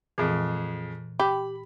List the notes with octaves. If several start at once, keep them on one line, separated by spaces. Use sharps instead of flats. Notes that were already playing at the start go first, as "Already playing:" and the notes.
F2 A#2 E3 G#3
G4 B5